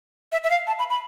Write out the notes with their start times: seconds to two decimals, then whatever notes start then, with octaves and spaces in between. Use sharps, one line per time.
0.32 E5
0.44 E5
0.50 F5
0.67 A5
0.79 B5
0.90 B5